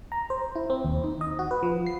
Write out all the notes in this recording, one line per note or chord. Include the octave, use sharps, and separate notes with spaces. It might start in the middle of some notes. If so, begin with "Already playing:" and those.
A#5
C5
E4
C4
D#2
D#4
D#5
F#4
B4
F3
C7